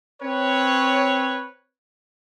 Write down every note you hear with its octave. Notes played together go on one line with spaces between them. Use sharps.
C4 B4 C#5